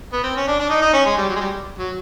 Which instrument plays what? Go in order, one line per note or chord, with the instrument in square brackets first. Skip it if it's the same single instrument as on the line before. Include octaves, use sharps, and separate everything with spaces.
[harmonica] B3
C4
C#4
D4
D4
D#4
D#4
C#4
G#3
G3
F#3
G#3
G3
F#3